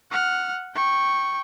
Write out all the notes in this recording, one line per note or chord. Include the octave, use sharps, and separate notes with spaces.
F#5 F6
G5 C#6